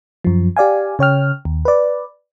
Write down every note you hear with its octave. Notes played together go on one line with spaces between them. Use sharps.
F#2 F3
G4 D5 F5 G#5
C#3 C#5 G5 F6
D#2
B4 D5